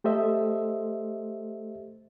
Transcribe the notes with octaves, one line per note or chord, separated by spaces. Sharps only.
A3 G4 A4 C5 D#5 E5